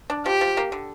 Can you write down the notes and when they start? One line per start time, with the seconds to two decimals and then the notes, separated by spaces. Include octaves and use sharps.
0.10 D4
0.25 F3 G4
0.41 F3
0.57 A#3
0.72 D3